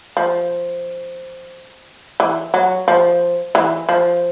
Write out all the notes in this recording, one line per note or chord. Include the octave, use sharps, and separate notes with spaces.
F3
E3
F#3
F3
E3
F3